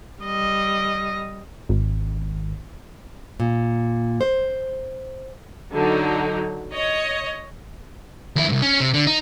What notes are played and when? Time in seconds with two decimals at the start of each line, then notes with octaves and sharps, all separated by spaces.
0.23 G3 D#5
1.69 G#1
3.40 A#2
4.21 C5
5.71 D3 F#3 D#4
6.75 C#5 D#5
8.36 D#2 E4
8.49 C2 G2
8.62 C#4
8.80 C3
8.94 D3
9.07 D#4